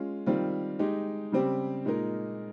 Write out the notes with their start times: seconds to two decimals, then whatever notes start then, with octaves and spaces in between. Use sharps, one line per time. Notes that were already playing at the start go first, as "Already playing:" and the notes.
Already playing: G#3 C#4 F4
0.26 D#3 G3 C4 F4
0.79 G#3 D#4 G4
1.32 C#3 G3 C4 G4
1.85 A#2 G#3 D#4 A#4